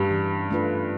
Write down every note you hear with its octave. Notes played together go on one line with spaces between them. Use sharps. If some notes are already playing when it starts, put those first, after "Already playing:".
Already playing: G2 G3
E3
A3 D4 F4 B4